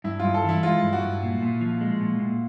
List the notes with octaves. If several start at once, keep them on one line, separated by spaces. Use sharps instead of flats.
G2 E4
G2 F4
A4
E3 E4
G#3 F4
G2
F#4
G2
A#2
A#2
F3
G#3
A#2
A#2